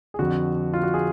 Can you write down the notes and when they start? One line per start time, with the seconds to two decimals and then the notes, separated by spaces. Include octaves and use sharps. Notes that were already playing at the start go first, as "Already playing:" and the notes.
0.14 G#4
0.19 F2 D3 F#4
0.73 F4
0.83 F#4
0.94 G#4